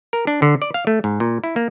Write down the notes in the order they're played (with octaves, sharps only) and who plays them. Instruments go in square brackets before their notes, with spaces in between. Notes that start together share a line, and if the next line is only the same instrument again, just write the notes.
[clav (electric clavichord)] A#4
D4
D3
D5
F5
A3
G#2
A#2
E4
A#3